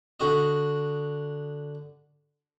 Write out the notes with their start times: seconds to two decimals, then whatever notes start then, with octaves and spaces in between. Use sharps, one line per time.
0.20 D3 F#4 D#5